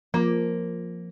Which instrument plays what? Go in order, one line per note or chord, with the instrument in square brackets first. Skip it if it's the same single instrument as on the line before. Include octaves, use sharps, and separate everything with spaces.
[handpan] F3 [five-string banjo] A#3